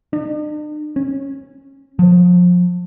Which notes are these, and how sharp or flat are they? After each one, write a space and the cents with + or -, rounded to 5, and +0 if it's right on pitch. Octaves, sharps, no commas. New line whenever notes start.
D4 +45
C#4 -20
F3 +30